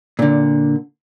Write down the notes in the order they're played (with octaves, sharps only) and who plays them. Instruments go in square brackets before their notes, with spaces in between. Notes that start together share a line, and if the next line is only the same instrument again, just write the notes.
[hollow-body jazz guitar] A#2 D3